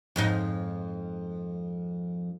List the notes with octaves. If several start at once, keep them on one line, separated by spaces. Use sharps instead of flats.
F2 G#2 D#4